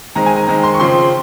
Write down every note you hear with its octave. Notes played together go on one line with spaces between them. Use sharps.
D#3 G#3 C4 A#5
G#5
A#5
D#3 G#3 C4 A#5
C6
C#6
C#3 F3 C4 C6